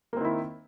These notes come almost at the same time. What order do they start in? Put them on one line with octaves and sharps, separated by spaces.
A#3 C4 D#3 E4